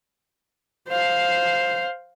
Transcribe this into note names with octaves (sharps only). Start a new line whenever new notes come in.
C5 F5